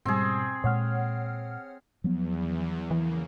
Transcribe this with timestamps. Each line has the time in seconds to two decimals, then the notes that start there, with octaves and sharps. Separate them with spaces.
0.05 G#2 B2 G3 C4 G#4
0.64 A#2 G#3 C#5 F#5 F6
2.04 E2 F3 F#3 B3
2.91 C#3 E3 A#3